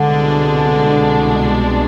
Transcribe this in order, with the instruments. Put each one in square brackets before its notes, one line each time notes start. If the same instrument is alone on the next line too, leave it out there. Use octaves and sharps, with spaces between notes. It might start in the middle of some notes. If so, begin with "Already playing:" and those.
Already playing: [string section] C2 B2 G#3 D4 [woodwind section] D3